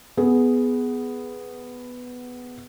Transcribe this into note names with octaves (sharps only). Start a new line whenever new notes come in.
B3 G#4